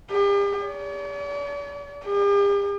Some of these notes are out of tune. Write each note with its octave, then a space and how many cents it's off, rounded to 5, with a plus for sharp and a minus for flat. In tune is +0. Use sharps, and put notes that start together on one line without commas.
G4 +40
D5 -45
G4 +45